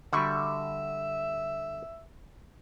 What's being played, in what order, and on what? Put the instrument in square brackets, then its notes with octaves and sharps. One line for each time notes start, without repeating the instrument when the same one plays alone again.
[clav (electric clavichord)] D3 G3 [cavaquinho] F#4 B5 C#6 [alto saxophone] E5